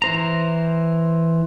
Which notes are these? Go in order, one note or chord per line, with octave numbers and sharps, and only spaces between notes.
E3 C5 A#5